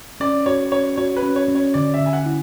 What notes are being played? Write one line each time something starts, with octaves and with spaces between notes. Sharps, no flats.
C#4 D5
F#4 C#5
C#4 C#5
F#4 C#5
B4
C#4
C#5
C#4
C#5
D3 D5
E5
D3
G#5
F#5
E4